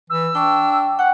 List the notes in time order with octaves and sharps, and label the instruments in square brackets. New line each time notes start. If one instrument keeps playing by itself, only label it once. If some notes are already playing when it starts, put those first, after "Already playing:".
[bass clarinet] E3 [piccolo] E6
[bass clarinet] D4 [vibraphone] G5 C#6
[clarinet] F#5 [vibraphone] G5